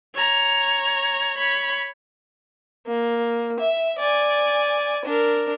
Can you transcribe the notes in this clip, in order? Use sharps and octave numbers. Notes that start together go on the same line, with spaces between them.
C#5 A#5
C#5 B5
A#3
E5
D5 G#5
D4 A#4